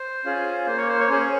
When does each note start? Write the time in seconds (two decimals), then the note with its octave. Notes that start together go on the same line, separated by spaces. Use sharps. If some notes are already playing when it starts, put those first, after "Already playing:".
Already playing: C5
0.25 C#4 F4 G#4
0.66 A#3 C5
0.77 C#5
0.89 C5
0.99 C#5
1.09 C#4 G#4 C5
1.20 C#5